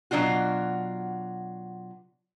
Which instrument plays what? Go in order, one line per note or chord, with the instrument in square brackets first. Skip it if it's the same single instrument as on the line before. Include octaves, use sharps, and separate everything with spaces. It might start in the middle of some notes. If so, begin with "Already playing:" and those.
[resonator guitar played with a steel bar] B2 F#3 D4 F4 F#4